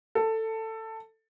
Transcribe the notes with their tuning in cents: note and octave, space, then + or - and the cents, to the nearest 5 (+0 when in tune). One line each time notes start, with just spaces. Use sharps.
A4 +15